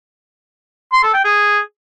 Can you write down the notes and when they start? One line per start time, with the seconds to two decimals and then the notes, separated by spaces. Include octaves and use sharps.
0.93 C6
1.03 A4
1.14 G5
1.25 G#4